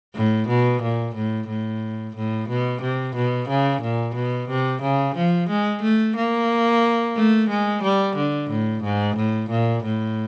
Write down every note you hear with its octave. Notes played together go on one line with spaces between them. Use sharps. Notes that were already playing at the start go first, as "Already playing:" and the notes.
A2
B2
A#2
A2
A2
A2
B2
C3
B2
C#3
A#2
B2
C3
C#3
F3
G#3
A3
A#3
A3
G#3
G3
D3
A2
G#2
A2
A#2
A2